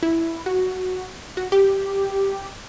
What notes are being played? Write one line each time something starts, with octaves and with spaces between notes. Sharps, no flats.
E4
F#4
F#4
G4